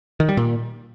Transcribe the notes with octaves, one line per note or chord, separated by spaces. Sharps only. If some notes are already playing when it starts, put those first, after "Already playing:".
D#3
G3
A#2